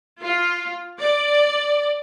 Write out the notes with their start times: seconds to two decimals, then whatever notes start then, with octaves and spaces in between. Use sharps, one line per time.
0.22 F4
0.99 D5